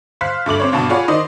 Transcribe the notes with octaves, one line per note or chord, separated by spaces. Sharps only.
C5 F5 F6 F#6 B6
G2 A3 D6 F#7
C4 C5 C#5
G#1 G2 B2 A5
F4 G#4 C#5 D5 F#5 B5
D#3 C5 D5 D#5